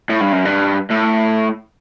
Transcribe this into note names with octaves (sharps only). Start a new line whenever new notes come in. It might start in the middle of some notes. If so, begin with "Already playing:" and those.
A2
G2
F#2
G2
A2